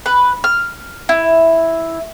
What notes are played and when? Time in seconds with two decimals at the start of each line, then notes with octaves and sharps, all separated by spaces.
0.06 B4
0.44 F6
1.09 E4